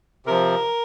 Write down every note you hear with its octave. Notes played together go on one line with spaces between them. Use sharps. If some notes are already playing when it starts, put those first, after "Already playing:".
C3 F3 A#4